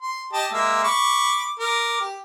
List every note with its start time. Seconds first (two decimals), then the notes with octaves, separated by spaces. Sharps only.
0.01 C6
0.33 G4 D#5 A5
0.52 G#3 A#3 E5
0.84 B5 C#6 D6
1.59 A#4 D6
2.01 G4